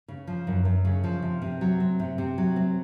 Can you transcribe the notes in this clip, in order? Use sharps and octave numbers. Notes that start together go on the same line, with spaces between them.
C#3
F3
F#2
F#2
C#3
F3
C3
C3
F#3
C4
C3
C3
F#3
C4